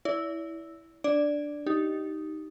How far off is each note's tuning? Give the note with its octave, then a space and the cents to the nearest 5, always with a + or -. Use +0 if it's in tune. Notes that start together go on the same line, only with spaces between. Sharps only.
E4 -5 D5 -40
D4 +0 D5 +0
D#4 +0 G4 -15